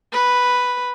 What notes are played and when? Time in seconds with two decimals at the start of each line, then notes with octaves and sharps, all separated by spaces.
0.13 B4